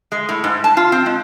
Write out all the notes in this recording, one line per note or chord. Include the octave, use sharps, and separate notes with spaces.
G#3
A2
G#2
A5
F4
C4
G#3